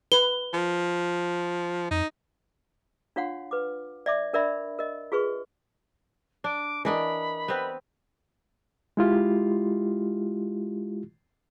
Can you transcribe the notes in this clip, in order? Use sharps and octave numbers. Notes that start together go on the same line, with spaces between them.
B4 G7
F3
F2 D#4
D4 F4 C#5 F5 F#5 C6
B4 D6
D5 E5 D6
D4 A#4 D5 E5 B5
A#4 D#5
F4 G#4 B4 C#6
D4 D6
E3 D4 A#4 D5 D#5 B5
B3 C4 B4
G#3 E4 F4 G4